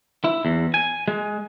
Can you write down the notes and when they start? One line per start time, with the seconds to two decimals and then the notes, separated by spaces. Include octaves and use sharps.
0.24 E4
0.45 E2
0.74 G#5
1.08 G#3